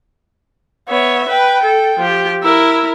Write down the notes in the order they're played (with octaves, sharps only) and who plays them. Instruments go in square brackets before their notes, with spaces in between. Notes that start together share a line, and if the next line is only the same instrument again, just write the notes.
[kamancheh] B3 [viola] C#5 E5
[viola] B4 [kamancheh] G5
[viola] A4
F3 G4
[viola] E4 A#4 [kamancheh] E6